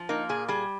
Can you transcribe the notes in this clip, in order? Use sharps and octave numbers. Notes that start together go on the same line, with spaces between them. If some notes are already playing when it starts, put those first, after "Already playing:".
Already playing: F3
A#3 D#4
A#2 G#4
G3 G#4